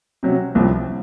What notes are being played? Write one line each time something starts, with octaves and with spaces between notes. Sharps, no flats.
C3 F#3 C#4
C2 C3 F3 C4